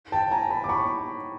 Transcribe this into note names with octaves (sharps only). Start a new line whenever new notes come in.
G5 A5
G#5 A#5
A5 B5
D6
B5 C#6